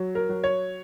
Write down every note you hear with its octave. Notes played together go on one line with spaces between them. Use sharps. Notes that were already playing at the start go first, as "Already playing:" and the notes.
Already playing: F#3
A#4
F#3
C#5